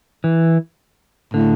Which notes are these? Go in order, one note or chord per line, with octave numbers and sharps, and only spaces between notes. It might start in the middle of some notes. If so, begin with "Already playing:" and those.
E3
A2 D3